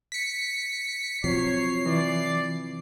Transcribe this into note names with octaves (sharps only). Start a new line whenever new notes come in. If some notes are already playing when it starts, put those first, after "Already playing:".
B6 C#7
C3 F3 F#3 C#5 C7
E3 D5